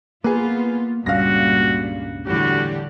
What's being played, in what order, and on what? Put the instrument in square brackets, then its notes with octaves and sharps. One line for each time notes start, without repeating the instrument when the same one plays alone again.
[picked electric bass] A#3 [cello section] B3 F4 [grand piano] G#4 B4
[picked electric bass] C#2 G2 C#3 [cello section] A#2 G3 [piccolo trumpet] F#4 [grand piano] F5 A#6
[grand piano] E2 A2 [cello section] D3 G3 G4 [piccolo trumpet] F#4